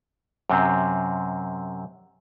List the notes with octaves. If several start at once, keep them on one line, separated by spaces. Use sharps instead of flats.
F#2 C3 C4